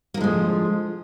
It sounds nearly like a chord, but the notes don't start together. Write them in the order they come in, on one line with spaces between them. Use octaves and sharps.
A#3 D3 G#3 F3